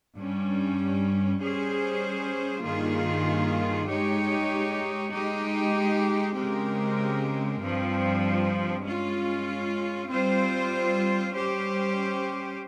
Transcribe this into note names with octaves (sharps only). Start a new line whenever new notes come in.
G2 G3 C#4
G3 C#4 G#4 C5
G2 D#3 A#3 F4 G#4
G#3 D#4 G4 C#5
G#3 D#4 G4
C#3 G#3 C4 G4 A#4
G2 F3 C4
G#3 C#4 F4
G3 C4 F4 C5
G3 C#4 G4 C5